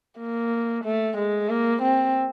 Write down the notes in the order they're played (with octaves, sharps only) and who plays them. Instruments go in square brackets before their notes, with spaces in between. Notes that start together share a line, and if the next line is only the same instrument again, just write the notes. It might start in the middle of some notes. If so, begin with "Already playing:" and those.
[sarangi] A#3
A3
G#3
A#3
C4